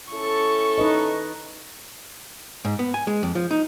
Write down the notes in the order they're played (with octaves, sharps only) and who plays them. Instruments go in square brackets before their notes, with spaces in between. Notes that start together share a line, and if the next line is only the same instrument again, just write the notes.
[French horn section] C#4 E4 A4 [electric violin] C#6
[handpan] D#4 B4 D#5
[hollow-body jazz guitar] G#2
B3
G#5
G#3
F2
F3
D#4